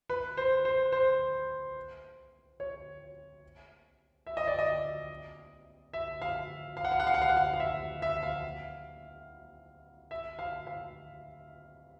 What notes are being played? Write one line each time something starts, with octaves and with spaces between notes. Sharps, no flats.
B4
C5
C5
C5
C#5
E5
D#5
D5
D#5
E5
F5
F5
F#5
F5
F#5
F5
F#5
F5
F#5
F5
F5
E5
E5
F5
E5
F5
F5